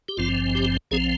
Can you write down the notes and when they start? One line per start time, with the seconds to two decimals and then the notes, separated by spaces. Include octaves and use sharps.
0.08 G4
0.17 G#1 G2 F3 C4 F4
0.55 G4
0.91 A#1 F3 C4 G#4